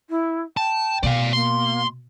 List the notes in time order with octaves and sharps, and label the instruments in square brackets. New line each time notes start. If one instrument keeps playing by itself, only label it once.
[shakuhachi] E4
[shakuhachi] G5 [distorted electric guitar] A5
[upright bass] B2 [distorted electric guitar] D5 F5
[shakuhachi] A#3 [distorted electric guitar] C6